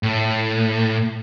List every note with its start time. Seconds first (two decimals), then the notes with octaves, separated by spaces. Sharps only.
0.03 A2